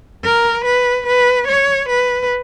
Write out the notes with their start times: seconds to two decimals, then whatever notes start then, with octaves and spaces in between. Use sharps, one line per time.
0.24 A#4
0.65 B4
1.07 B4
1.48 C#5
1.89 B4